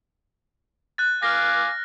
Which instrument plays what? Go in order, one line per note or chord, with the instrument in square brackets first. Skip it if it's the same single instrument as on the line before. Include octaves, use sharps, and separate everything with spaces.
[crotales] F#6 A6
[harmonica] F5 G#5 D6 [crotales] F6 A#6